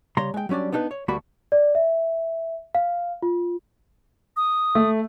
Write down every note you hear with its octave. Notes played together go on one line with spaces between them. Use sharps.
C#3 G3 C#5 A#5 C6
G#3 G5
F#3 G3 C#4 D4 D5
B3 D4 D#4 A#4 B4
C#5
D2 G3 A3 A#3 F#4 B5
D5
E5
F5
F4
D#6
A3